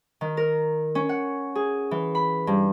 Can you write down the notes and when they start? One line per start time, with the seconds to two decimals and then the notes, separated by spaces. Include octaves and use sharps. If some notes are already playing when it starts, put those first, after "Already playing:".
0.21 D#3
0.37 A#4
0.95 C#4
1.09 F#5
1.55 G#4
1.91 E3
2.15 B5
2.47 G2